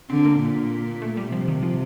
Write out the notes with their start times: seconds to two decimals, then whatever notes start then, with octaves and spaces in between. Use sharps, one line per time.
0.10 D3 C4
0.25 A#3
0.40 A#2
1.02 A3
1.17 G3
1.32 C3 F3
1.48 D#3
1.62 F3